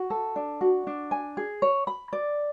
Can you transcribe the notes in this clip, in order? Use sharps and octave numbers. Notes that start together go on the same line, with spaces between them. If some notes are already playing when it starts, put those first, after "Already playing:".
Already playing: F#4
A4
D4
F#4
D4
G#5
G#4
C#5
B5
D5